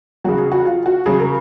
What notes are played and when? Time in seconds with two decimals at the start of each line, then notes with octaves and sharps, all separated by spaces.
0.24 C#3 F#3 F#4
0.38 G#4
0.52 F#4
0.65 F4
0.86 F#4
1.06 C#3 F#3 G#4
1.20 A#4